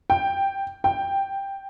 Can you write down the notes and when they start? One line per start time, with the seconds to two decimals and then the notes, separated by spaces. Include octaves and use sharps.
0.10 G5
0.84 G5